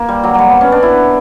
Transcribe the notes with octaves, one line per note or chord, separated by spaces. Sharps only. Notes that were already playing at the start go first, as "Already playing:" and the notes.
Already playing: A#3
G3
F#3
F#3 G3
B3
C#4
D4
E4